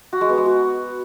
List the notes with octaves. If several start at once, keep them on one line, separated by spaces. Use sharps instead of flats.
F#4
G#3
B3
G#3
F#4